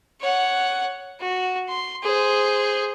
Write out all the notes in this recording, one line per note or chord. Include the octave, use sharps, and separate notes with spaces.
C#5 F#5
F#4
C6
G#4 C5